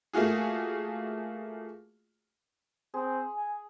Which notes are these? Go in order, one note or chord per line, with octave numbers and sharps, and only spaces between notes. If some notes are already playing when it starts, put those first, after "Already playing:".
A3 A#3 F4 F#4 G#4
C4 G#4
G#5